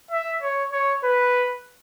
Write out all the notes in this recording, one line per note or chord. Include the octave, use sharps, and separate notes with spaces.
E5
C#5
C#5
B4